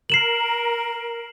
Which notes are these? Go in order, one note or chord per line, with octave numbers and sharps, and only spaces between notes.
A#4 C7 E7 F#7